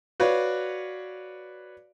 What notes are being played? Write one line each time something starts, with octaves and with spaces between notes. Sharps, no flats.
F#4 B4 C#5 D5 F5